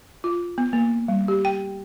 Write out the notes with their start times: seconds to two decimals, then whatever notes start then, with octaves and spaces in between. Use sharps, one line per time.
0.24 F4
0.58 B3
0.73 A#3
1.08 G3
1.28 G4
1.45 G5